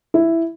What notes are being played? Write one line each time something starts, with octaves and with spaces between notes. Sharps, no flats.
E4